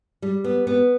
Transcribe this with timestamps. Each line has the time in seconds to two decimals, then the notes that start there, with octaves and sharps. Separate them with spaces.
0.22 G3
0.44 B3
0.67 B3